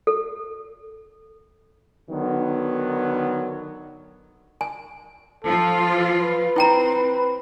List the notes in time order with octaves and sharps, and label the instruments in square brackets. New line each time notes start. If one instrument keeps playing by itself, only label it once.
[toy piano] A4
[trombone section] D3 D#3 F#3 B3
[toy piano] G#5
[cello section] F3 F4 [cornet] A4
[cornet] B4
[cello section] C4 [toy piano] E4 G5 A#5